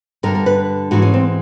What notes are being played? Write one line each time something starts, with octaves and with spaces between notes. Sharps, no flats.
G2 D3 A#4
A#4
B4
G#2 E3 F#4
C#4
C4